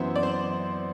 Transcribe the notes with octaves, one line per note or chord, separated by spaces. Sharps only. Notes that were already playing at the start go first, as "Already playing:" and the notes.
Already playing: F#2 E3 B3 C5 E5
D5
C5